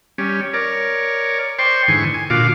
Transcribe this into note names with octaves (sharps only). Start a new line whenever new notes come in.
G3 C#4
A#4 C#5 D5
C5 D5 G5 C6 C#6
G#2 D3 E3 G#5 C#6
G#5
A#2 D3 F4 F#4 F5 D6